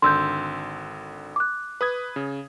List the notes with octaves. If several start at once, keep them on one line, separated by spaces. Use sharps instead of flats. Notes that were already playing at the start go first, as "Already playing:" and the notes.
G#1 D3 C6 E6 G6
D6 F#6
B4 D#6 G#6
C#3